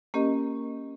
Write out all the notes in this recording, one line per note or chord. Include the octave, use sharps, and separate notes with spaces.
A#3 C#4 G4 A#4 D#5